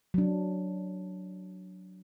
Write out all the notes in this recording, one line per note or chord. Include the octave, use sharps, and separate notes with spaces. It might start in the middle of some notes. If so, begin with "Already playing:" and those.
F#3 D4